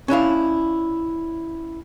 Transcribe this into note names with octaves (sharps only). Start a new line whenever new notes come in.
C#4 D4 E4 F5